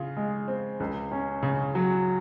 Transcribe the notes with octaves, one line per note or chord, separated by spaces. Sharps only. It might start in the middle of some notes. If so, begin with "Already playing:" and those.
Already playing: C#3 F4
G#3
C4
C#2
C#4
C#3
F#3